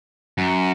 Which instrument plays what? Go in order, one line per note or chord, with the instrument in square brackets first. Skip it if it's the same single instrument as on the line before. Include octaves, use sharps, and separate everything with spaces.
[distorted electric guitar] F#2